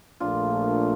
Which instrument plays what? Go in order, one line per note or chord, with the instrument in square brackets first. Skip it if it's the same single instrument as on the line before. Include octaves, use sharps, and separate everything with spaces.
[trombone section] A#1 A#2 A3 [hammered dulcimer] D4 F4